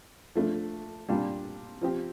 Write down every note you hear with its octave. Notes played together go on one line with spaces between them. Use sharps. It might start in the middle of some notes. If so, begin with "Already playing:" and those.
F3 A3 D4
A#2 G3 D4 F4
F3 C4 G4